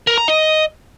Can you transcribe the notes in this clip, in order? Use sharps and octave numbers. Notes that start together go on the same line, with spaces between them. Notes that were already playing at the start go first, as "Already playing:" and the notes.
A#4
A#5
D#5